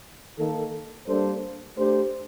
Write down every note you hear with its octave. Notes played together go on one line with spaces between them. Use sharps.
D#3 A#3 D#4 A4
G3 A#3 D4 A4 C5
A3 D4 G4 C5